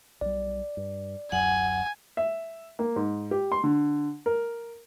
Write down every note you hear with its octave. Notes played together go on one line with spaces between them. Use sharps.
B1 G3 D5
G2
D1 F#2 F#3 F#5 G#5
E5
A#3
G#2
G4
C6
D3
A#4